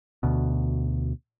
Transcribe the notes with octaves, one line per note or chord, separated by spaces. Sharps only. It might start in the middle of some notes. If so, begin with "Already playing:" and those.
D2 B2